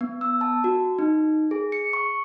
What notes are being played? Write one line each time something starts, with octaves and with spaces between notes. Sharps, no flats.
B3
E6
A5
F#4
D#4
G#4
C#7
C#6